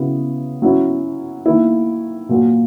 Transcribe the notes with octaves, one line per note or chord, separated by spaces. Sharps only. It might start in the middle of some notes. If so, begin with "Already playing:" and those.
Already playing: C#3 F#3 B3 E4
F#3 C#4 E4
D#3 A#3 E4
A#2 F#3 A#3